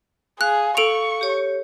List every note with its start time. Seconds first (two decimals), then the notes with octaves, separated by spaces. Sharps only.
0.41 G#4 F5 F#6
0.77 A4 C#6 D7 F7
1.21 G4 C#5